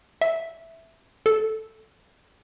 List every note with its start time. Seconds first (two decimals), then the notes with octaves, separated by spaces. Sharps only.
0.21 E5
1.26 A4